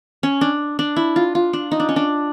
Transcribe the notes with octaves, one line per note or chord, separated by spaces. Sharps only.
C#4
D4
D4
E4
F4
F4
D4
D#4
D4
C#4
D4